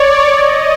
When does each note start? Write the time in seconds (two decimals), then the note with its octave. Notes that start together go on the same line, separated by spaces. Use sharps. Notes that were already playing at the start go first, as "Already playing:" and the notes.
Already playing: C#5 D5
0.28 D#5